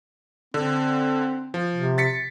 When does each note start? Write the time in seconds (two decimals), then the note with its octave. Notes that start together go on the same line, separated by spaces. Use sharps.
0.54 D3 C4
1.54 F3
1.75 C3
1.98 A6 B6 C#7